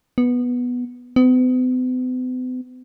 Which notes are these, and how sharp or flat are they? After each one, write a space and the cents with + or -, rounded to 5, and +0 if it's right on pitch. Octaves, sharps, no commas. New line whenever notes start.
B3 -5
B3 +45